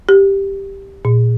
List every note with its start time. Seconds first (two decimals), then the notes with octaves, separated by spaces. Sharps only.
0.09 G4
1.05 A#2